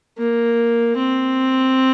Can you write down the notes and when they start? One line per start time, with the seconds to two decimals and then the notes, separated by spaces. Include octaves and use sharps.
0.18 A#3
0.96 C4